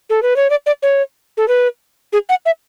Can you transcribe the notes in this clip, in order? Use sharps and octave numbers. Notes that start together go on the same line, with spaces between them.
A4
B4
C#5
D5
D5
C#5
A4
B4
G#4
F#5
E5